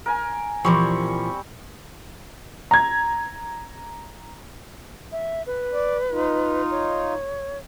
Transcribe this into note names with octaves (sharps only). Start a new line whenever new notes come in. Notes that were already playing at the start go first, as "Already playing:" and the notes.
A#4 G#5
A#2 E3 F3 G3 C4 C#6
A#5 G#6
E5
B4
D5
D#4 F4
C#5